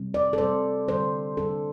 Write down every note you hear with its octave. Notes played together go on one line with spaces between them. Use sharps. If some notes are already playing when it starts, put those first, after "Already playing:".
Already playing: C3 G3 C4
D5
A4
C3 G3 C4 C5
D3 G3 D4 C5
D3 G3 D4 A4